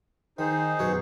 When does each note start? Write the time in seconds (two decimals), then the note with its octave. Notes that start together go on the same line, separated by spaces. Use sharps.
0.39 D#3 D#4 G#4 C5
0.79 F#2 B2 C#5